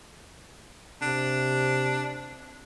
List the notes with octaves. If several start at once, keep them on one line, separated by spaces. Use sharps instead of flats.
C3 D4